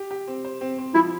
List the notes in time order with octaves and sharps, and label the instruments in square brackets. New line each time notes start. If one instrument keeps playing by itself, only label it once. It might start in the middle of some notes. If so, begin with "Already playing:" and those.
Already playing: [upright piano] G4
G4
C4
C5
C4
C4
[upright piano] F3 [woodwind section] E4